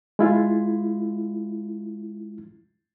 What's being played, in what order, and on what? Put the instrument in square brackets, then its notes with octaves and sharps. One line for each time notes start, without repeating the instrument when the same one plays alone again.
[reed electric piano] G#3 E4 F4